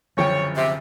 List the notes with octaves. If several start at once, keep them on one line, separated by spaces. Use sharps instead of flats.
F#1 D3 F3 F#3 C#5 G5
C3 E5